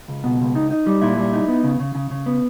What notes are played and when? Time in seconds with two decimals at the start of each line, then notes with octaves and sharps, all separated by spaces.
0.08 C#2
0.24 B2
0.40 C#2
0.55 D#4
0.71 D#4
0.87 G3
1.02 A#2 E4
1.17 G3
1.33 D#4
1.48 B3
1.64 C#3
1.79 C#3
1.95 C#3
2.11 C#3
2.26 B3